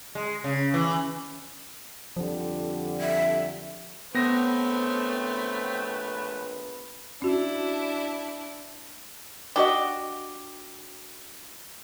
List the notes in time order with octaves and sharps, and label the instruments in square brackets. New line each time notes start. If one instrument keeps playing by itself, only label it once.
[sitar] G#3
C#3
E3
[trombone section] F2 D3 G3 [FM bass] F3
[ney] E5
[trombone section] A#1 B4 [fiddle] A3 C#5 [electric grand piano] B3 A#6 [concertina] C4 G5
[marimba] C#4 F#4 [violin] D4 E4
[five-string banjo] D4 F#4 D#5 [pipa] G4